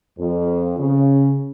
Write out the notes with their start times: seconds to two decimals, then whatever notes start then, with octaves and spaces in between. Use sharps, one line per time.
0.19 F2
0.78 C#3